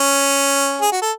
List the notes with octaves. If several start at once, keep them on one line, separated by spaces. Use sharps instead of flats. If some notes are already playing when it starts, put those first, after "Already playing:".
Already playing: C#4
G#4
F#4
A4